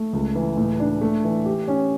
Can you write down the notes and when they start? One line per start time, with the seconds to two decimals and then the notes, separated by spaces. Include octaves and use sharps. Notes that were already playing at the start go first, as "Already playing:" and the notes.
Already playing: A3
0.13 C#2
0.35 E3
0.57 A2
0.80 D4
1.01 A3
1.24 E3
1.46 G4
1.68 C#4